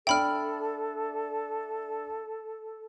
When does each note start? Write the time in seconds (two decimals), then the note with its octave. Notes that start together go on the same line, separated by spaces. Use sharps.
0.07 D4 A4 E5 G5 B5 F6